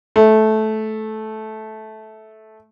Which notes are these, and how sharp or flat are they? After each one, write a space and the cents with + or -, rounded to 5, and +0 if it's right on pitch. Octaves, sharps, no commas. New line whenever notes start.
A3 -15